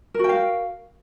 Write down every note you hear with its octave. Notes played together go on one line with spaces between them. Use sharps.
F#4 A#4 F5 G5